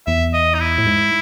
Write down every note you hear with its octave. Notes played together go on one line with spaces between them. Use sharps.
E2 E5
D#5
D#4
E4
A2
G#2